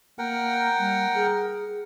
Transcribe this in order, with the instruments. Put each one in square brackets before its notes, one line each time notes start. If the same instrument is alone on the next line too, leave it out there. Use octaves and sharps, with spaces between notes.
[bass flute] A#3 [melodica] A#4 F#5 G5
[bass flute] G3
G#4